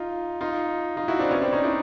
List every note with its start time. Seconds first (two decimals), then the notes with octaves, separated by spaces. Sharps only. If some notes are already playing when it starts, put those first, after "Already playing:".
Already playing: D#4 F4
0.41 D#4 F4
0.96 D#4 F4
1.08 E4 F#4
1.19 C4 D4
1.31 B3 C#4
1.42 C4 D4
1.53 C#4 D#4
1.64 D4 E4